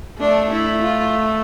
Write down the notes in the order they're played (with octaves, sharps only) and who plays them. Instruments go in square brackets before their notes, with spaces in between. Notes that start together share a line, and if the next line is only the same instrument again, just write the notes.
[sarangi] A3 [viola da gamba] D4
[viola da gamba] E4
F4